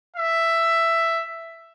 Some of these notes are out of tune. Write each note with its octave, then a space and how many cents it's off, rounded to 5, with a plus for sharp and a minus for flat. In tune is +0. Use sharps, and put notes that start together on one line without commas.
E5 +10